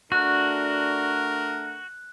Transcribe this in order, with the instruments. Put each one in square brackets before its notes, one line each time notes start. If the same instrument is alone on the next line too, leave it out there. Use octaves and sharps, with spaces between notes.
[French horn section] A3 D4 [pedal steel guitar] F#4 [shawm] A#4 [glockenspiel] F#6